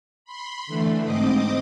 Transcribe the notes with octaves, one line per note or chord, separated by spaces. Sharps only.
B5 C6
D3 E3 A3
G#2 C4 D#5 D6 D#6